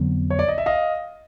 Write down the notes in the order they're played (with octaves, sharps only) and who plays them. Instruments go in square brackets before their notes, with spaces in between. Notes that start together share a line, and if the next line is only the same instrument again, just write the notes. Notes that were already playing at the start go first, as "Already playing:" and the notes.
Already playing: [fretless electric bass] F2 D3 F#3 B3
[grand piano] C#5
D5
D#5
E5
D#5 F5